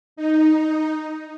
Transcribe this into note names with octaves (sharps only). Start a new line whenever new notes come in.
D#4